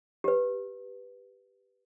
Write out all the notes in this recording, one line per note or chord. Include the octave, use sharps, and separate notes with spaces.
G4 B4